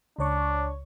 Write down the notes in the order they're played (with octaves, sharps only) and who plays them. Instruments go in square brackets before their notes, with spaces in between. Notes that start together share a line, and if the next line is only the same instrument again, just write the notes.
[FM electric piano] C#2 C#5 C#6 [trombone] D4